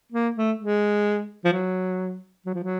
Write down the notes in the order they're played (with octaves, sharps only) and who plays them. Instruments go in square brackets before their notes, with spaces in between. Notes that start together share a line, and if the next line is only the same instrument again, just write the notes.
[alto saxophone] A#3
A3
G#3
F3
F#3
F#3
F3
F#3